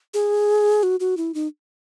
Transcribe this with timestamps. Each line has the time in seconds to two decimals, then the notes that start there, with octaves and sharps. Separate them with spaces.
0.14 G#4
0.83 F#4
1.00 F#4
1.17 E4
1.34 D#4